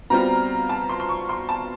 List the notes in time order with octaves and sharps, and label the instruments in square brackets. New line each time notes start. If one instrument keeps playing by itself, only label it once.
[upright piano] B2 G3 C4 F4 A#5
A5
C6
C6
C#6
C6
A5